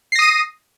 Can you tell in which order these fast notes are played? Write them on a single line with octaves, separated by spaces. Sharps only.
C7 A#6 D#6 D#7